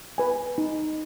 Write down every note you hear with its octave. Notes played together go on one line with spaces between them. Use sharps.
B4 G#5
D#4